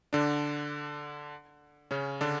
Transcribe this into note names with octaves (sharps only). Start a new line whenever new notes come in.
D3 D4
C#3 C#4
D3 D4